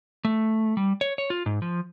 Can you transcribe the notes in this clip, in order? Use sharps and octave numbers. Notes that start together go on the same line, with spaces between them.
A3
G3
C#5
C#5
F4
G#2
F3